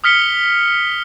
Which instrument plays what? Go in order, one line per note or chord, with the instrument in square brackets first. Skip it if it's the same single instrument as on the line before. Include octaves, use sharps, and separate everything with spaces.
[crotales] D#6 F6 B6 C#7 G7